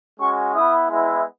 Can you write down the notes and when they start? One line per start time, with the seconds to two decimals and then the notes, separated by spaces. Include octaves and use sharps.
0.20 G#3 C#4 F#4 C#6
0.54 B3 E4 D#6
0.89 G#3 B3 E4